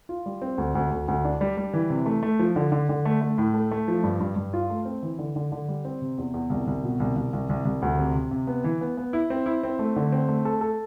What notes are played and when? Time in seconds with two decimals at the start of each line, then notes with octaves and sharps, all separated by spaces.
0.09 F4
0.26 G3
0.42 C4
0.58 D2
0.75 D2
0.91 D2
1.08 D2
1.25 D4
1.41 G3
1.57 G3
1.73 E3
1.90 C3
2.06 A3
2.23 A3
2.39 F3
2.56 D3
2.72 D3
2.89 D3
3.05 A3
3.21 A3
3.38 A2
3.54 A3
3.71 A3
3.88 F3
4.03 G2
4.20 G2
4.36 G2
4.53 F4
4.69 A3
4.85 C4
5.03 E3
5.19 D3
5.36 D3
5.52 D3
5.68 G3
5.85 C4
6.02 C3
6.18 E2
6.34 E2
6.50 C2
6.67 C2
6.84 B2
7.00 C2
7.16 C2
7.33 C2
7.49 C2
7.65 C2
7.82 D2
7.98 C3
8.15 C3
8.31 C3
8.47 B3
8.64 E3
8.81 B3
8.97 B3
9.13 E4
9.30 C4
9.46 E4
9.63 C4
9.79 A3
9.96 D3
10.12 C4
10.28 A3
10.45 A4
10.61 A4